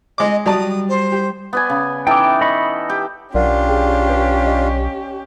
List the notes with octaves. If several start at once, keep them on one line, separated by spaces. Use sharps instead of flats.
G#3 D#5 D6
F#3 G3 D5 A5 D#6
C5
G4
B3 D5 G#5
C#3
E3 D#4 A4 G5 D6
D#5 B5 C#6
G4
B1 C#4 D4 F4 G4 A#4 D5 F#5
G#4 G5
B4
D#5